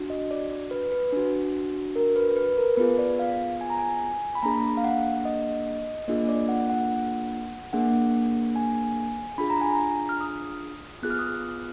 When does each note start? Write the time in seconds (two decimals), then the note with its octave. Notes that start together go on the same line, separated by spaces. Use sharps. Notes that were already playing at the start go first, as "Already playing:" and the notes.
Already playing: D4 F#4
0.10 D#5
0.31 D5
0.71 B4
0.92 B4
1.12 D4 F#4
1.96 A#4
2.16 B4
2.37 B4
2.58 A#4
2.77 B3 F4 G#4 B4
2.99 D5
3.19 F5
3.61 G#5
3.70 A#5
3.79 G#5
4.35 B5
4.43 A#3 D4 G#4 A#5
4.77 F5
4.84 F#5
5.25 D#5
6.08 A#3 D4 F4 G#4 D#5
6.29 D5
6.49 F#5
6.70 F#5
7.73 A#3 D4 G#4 F#5
8.56 G#5
9.38 D4 F4 G#4 B5
9.50 A#5
9.61 G#5
9.73 A#5
10.09 F6
10.21 D#6
11.03 B3 F4 G#4 F#6
11.10 F6
11.19 D#6
11.27 F6